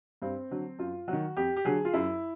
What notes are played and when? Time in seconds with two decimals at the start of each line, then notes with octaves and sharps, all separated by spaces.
0.22 G2 C4
0.51 D3 F#3
0.79 F#2 F4
1.08 F#3 F#4
1.13 D#3
1.37 F2 G4
1.56 G4
1.65 D3 F#3 G#4
1.85 F4
1.93 F#2 E4